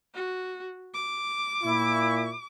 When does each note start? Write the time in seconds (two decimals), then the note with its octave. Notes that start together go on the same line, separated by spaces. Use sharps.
0.14 F#4
0.94 D6
1.64 A#2 E4